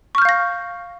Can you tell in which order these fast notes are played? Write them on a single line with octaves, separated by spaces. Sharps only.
C#6 F6 G6 F5 A#6